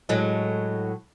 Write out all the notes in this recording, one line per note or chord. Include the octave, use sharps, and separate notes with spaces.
A2 F#3 G#3